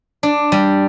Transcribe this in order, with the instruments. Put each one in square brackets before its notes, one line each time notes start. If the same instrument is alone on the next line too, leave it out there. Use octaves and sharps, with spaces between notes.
[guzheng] D4
G3